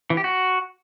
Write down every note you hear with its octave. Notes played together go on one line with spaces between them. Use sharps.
E3
G4
F#4